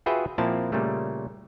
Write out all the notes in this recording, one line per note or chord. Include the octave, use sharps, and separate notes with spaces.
F4 F#4 G#4 B4 E5 G5
A#2 F3 A#3 C4 E4 A5
A#2 C#3 G3 A3